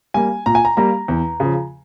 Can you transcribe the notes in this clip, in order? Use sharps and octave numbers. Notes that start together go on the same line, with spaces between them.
G3 A#3 G#5
A#2 A#5
G#5
A#5
G3 A#3 A#5
E2
C#3 F3